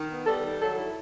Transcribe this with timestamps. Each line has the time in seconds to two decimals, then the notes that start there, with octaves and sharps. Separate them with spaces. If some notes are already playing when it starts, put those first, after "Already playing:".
Already playing: D#3
0.10 B3
0.27 G3 A4
0.43 D#3
0.60 F#3 A4
0.76 E4